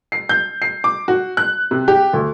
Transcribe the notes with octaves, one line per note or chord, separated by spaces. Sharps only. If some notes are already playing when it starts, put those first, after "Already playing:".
C7
G6
C7
D6
F#4
F#6
C3
G4
D2